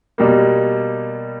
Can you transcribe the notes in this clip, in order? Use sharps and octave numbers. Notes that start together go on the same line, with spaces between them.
B2 G3 A#3